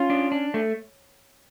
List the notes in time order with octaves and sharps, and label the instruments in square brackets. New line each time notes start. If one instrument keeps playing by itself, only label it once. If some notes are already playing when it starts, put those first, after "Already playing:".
Already playing: [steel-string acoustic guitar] C#4 [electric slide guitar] F4
[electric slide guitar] D4
D4
A3